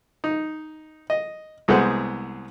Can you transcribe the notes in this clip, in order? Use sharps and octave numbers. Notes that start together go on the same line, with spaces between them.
D#4
D#5
C2 G#3 B3 G#4 C5 F#5